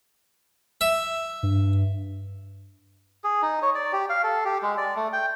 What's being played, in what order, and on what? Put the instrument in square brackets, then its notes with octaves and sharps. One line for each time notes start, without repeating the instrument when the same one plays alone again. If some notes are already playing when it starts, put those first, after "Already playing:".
[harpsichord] E5
[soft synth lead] G2
[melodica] G#4
D#4
C#5
D5
G4
F5
A4
G4
G#3
D5
A3
G5